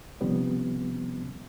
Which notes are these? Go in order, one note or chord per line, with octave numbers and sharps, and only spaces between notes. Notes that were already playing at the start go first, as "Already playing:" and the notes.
C3 D#3 F3 G3 B3 C#4